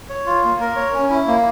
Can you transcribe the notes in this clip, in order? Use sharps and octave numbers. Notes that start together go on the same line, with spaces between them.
C#5
F4
A#3
A#4
C#5
C#4
E4
A#3